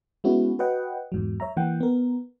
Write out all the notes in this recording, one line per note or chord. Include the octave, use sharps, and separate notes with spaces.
G#3 B3 C#4 E4 F#4
F#4 B4 C#5 D#5 F#5 G5
E2 G#2 F#3
C#5 E5 A#5
E3 A#3 F#5 G5
B3 A#4